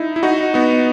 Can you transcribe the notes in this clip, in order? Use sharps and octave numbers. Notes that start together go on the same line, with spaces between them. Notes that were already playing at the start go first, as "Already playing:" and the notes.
Already playing: D#4 E4
E4
D#4 F#4
B3 D#4